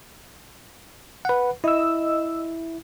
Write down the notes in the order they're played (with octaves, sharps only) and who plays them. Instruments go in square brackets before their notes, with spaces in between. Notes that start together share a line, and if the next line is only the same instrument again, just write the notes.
[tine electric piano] B4 F#5
[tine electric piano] E4 [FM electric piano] D#5 E6